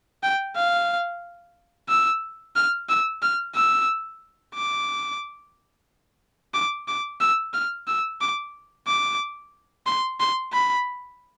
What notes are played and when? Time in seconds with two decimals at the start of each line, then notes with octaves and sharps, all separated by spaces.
0.23 G5
0.56 F5
1.89 E6
2.56 F6
2.89 E6
3.22 F6
3.55 E6
4.55 D6
6.54 D6
6.88 D6
7.21 E6
7.54 F6
7.87 E6
8.21 D6
8.87 D6
9.86 C6
10.20 C6
10.53 B5